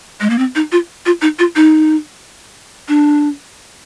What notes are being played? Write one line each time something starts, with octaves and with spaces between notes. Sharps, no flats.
G#3
A#3
C4
D#4
F4
F4
D#4
F4
D#4
D4